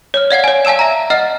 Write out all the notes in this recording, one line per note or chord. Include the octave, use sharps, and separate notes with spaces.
C#5 F6
D5 F5 F#5 G#6
C#5 G#5
F5 G#5 A5 E6 E7
E5 A#5
D#5 F#5 F6 A6